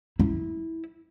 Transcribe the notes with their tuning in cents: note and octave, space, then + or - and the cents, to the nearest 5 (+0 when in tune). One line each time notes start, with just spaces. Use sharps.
E4 -15